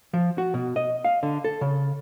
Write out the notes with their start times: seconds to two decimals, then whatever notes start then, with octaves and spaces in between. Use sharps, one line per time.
0.13 F3
0.38 F#4
0.54 B2
0.76 D#5
1.05 F5
1.23 D3
1.44 A4
1.61 C#3